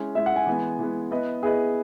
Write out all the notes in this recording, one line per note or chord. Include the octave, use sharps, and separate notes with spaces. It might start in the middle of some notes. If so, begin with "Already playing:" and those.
Already playing: G#3 C#4 E4
G#3 C#4 E4 E5
F#5
G#5
E3 G#3 B3
E3 G#3 B3
B3 E4 B4 D#5
B3 E4 G#4 B4 D#5